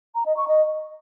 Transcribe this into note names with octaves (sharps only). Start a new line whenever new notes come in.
A#5
D#5
C#6
D#5